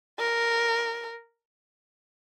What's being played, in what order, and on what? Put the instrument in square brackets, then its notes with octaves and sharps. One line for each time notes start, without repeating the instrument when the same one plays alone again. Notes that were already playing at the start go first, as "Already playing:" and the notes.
[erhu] A#4